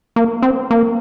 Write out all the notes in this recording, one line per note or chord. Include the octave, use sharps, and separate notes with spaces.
A#3
C4
A#3